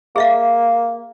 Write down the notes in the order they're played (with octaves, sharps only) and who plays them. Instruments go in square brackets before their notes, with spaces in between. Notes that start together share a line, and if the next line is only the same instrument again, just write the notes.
[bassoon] A#3 [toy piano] G#4 E5 F5